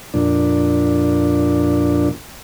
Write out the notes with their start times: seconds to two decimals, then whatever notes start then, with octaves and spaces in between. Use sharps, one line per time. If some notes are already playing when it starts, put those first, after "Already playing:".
0.14 F2 A#2 D4